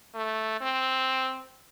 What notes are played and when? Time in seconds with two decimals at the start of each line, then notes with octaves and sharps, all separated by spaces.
0.15 A3
0.61 C4